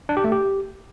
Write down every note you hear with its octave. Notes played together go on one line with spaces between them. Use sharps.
D4
G4
A3
G4